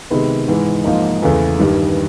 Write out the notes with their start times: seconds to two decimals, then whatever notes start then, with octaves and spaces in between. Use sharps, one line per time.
0.10 C3 D#3 G#3 B3
0.48 G#2 E3 G#3
0.84 G#2 F3 A#3 D#4
1.22 E2 C#3 E3 A3
1.59 G2 D#3 G3